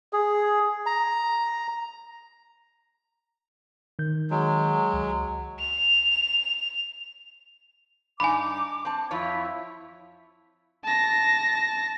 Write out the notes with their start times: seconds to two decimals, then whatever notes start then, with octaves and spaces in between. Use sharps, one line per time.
0.13 G#4
0.86 A#5
3.99 D#3 G6
4.31 F#3 G#3
4.94 C#2
5.59 F7
8.20 G2 D4 D#4 G#5 B5 D6
8.85 C4 A5
9.11 F2 E4 F4 C#5
10.84 A5 A#6